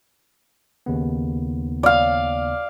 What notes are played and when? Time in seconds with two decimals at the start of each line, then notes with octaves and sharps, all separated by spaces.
0.86 D#2 C#3 B3
1.83 D5 F5